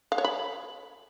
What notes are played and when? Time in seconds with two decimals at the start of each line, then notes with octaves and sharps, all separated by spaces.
0.12 F5
0.18 C#5
0.25 B5